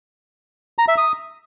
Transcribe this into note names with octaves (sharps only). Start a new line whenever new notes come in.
A#5
E5
D#6